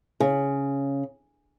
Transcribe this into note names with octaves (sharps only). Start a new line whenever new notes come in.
C#3